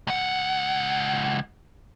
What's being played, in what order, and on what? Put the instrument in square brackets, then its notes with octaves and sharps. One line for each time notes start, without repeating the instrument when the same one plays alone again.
[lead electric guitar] C#2 F#5